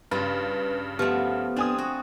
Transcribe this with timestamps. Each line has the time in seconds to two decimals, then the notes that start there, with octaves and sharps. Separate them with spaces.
0.11 G2 C#3 F4 B4
0.99 F3 A3 B3 G4 F6
1.56 C4 D4 G#5 D#6
1.78 F#4